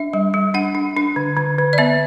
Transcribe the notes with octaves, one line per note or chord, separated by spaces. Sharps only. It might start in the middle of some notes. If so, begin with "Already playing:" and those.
Already playing: D4 E5
G3
G3
D4 F#5
D4
D4
D3
D3
D3
D5
B3 E5